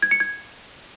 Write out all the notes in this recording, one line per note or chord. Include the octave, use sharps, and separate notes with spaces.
G#6
C#7
G#6